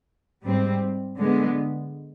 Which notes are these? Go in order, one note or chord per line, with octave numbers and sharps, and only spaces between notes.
G#2 G3 C4
D3 G#3 B3